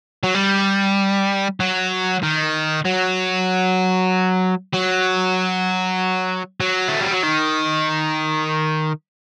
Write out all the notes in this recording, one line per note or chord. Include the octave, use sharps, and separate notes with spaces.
F#3
G3
F#3
D#3
F#3
F#3
F#3
A3
G3
F#3
D#3